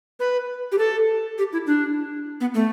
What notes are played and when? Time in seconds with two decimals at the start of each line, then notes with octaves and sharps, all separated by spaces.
0.20 B4
0.72 G4
0.78 A4
1.38 G4
1.53 E4
1.67 D4
2.41 B3
2.54 A3